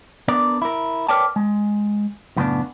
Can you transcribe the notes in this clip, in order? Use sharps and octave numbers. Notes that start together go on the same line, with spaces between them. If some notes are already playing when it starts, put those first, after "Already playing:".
B3 D4 A#4 D5
E4 A#4
A#4 B4 C#5 D5 G5 A5
G#3
F#2 A2 C#3 A#3 B3 D4